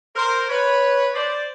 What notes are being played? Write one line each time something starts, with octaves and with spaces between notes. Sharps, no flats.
A#4 C5
B4 C#5
C5 D5